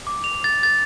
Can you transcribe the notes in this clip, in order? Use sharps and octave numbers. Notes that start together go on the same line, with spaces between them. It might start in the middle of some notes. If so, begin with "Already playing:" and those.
D6
F7
A6
A6